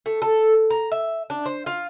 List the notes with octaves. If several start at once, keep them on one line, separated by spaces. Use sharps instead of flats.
A3
A4
A#5
E5
D4
C5
F4